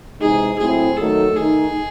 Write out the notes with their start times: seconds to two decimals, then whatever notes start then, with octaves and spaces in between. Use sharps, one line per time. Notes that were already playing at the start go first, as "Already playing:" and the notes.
0.20 C3 E3 G#3 D#4 G#4
0.59 A2 F#3 A3 C4 E4 G#4
0.97 D#3 F#3 A3 D#4 A4
1.36 D#3 A3 D#4 G#4